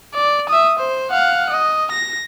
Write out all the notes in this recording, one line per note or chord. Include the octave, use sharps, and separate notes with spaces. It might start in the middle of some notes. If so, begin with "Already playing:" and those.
D5
E5 D#6
C5
F5 F#5
D#5
A#6